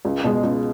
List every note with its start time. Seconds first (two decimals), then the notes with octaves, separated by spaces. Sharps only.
0.05 C#2
0.24 B2 G#3
0.43 C#2